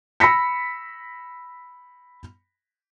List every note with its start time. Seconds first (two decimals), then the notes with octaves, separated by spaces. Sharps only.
0.20 B5 E6 A#6 B6 C#7